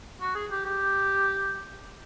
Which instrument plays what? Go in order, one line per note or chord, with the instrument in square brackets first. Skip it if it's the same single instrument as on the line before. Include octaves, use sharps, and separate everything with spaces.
[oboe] F#4
G#4
G4
G4